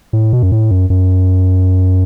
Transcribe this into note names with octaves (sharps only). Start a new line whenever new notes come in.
A2
B2
F#2
A2
F#2
F#2